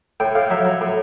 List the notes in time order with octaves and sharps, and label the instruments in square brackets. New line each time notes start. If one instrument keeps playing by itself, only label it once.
[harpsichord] A2 G5
A2 F5
F#3 E5
F#3
A2